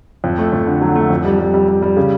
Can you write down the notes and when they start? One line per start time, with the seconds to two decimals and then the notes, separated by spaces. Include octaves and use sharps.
0.24 F2
0.38 A3
0.53 F2
0.67 D3
0.81 F#3
0.96 A3
1.10 F2
1.25 G3
1.39 G3
1.54 G3
1.68 G3
1.82 G3
1.97 C#3